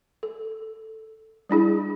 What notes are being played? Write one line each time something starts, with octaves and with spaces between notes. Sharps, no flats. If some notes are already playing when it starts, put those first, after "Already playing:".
A4
G3 D4 E4 G#4